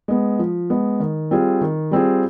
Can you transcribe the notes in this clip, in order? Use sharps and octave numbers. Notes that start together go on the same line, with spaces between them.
G#3 B3
F3
G#3 B3
D#3
G3 C4 F4 G#4
D#3
G3 C4 F4 G#4